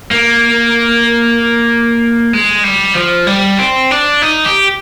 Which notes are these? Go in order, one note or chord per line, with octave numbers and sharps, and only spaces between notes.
A#3
G#3
G3
F3
G3
C4
D4
D#4
G4